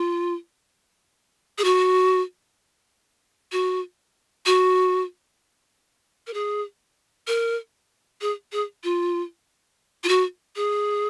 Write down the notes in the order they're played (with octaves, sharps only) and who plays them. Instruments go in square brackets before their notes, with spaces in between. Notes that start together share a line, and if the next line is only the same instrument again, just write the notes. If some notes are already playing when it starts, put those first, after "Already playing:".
Already playing: [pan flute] F4
G#4
F#4
F#4
F#4
A#4
G#4
A#4
G#4
G#4
F4
F4
F#4
G#4